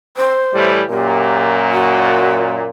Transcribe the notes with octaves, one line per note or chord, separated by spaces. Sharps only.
C5
A2 E3 G3
F#2 A#2 G4
F#4